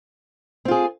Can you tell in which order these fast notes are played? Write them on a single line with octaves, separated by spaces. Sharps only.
C4 F4 G#4